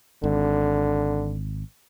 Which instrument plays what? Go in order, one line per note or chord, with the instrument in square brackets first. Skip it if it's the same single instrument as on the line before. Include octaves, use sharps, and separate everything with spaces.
[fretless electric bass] G#1 [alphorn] D3